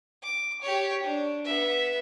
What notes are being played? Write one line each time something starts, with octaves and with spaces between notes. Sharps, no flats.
D6
G4 C#5
D4
B3 E5